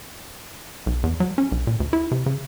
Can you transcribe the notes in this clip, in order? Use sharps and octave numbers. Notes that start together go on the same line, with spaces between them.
B1
E2
F#3
C#4
B1
A#2
D2
E4
C3
C#3